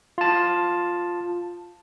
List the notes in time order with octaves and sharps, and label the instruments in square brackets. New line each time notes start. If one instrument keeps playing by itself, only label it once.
[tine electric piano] F4 A5